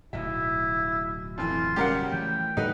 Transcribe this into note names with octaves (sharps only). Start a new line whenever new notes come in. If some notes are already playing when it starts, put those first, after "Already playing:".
D1 B1 B2 E4 E5
F2 E3 F4
C#3 G3 G4 A#4 F5 F#5
E3 F3 A3 G5
A2 D3 G3 D#4 B4 F#5